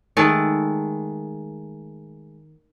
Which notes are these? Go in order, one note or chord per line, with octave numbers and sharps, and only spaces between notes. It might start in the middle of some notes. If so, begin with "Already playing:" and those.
D#3 G#3 A3 A4